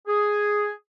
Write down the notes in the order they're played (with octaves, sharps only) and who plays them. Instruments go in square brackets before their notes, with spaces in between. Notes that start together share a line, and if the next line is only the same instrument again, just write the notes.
[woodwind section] G#4